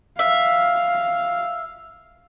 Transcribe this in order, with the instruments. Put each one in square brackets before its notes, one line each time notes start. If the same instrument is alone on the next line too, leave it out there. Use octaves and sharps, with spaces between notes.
[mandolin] E5 [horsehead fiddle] F5